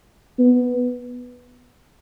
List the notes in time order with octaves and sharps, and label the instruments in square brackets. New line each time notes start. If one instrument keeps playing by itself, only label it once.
[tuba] B3